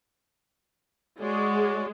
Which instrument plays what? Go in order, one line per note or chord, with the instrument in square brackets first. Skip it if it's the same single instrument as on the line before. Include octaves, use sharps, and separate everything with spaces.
[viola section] G#3 [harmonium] F#4 C#5 D5